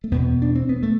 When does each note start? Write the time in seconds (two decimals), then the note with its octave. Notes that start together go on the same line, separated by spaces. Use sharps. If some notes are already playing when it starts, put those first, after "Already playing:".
0.04 A3
0.11 E2 B2 B3
0.42 D4
0.55 C4
0.69 B3
0.83 A3